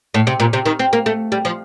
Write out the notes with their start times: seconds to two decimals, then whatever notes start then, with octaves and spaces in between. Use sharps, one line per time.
0.14 A2
0.27 C3
0.40 A#2
0.53 C3
0.66 D#3
0.79 C4
0.93 A#3
1.06 A3
1.32 G3
1.45 F3